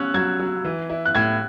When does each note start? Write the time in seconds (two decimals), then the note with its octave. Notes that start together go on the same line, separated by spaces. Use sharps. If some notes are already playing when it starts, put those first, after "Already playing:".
Already playing: C#4 E6 F#6
0.14 F#3 G#6
0.39 F#3
0.65 E3
0.90 E4
1.05 F#6
1.15 A2 G#6